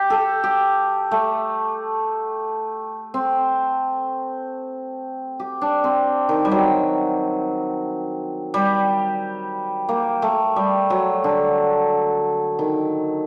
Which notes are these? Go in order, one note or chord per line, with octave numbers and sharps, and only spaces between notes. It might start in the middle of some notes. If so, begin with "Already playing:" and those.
Already playing: G4
A4
G4
A3
C4
G4
D4
C4
D#3
G3
F#3
G3
A#3
A3
G3
F#3
D3
D#3